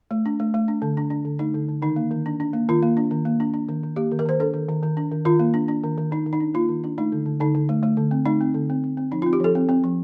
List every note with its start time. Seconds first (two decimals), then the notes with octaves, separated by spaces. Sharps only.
0.11 A3
0.26 D4
0.40 A3
0.54 A3
0.68 D4
0.82 D3
0.97 D4
1.10 D4
1.25 D3
1.39 A3 D#4
1.54 D3
1.69 D3
1.82 D#3 D#4
1.96 A#3
2.11 D#3
2.26 D4
2.40 D4
2.53 A#3
2.69 D#3 F4
2.83 A#3
2.97 D4
3.11 D#3
3.25 A#3
3.40 D4
3.54 D4
3.69 D#3
3.83 D#3
3.96 A#3 G4
4.11 D#3
4.19 A#4
4.26 D#3 C5
4.40 D4 A4
4.54 D#3
4.69 D#3
4.83 D#3
4.97 D4
5.12 D#3
5.25 D#3 F4
5.39 A#3
5.54 D4
5.68 D4
5.84 D#3
5.98 D#3
6.11 D#3 D#4
6.26 D#3
6.33 D#4
6.40 D4
6.54 A#3 F4
6.68 D#3
6.84 D4
6.98 A3 D#4
7.12 D3
7.26 D3
7.40 D3 D#4
7.55 D3
7.69 A3
7.83 A3
7.97 D3
8.11 C4
8.26 A3 D#4
8.41 C4
8.54 D3
8.70 C4
8.84 C4
8.97 C4
9.11 F3 D#4
9.22 F4
9.26 C4
9.33 G4
9.40 F3 A4
9.55 C4
9.69 C4
9.84 F3